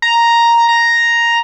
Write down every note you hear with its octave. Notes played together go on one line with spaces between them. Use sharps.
A#5
A#5